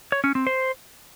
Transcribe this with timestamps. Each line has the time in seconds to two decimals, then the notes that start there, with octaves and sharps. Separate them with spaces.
0.12 C#5
0.24 C#4
0.35 C4
0.47 C5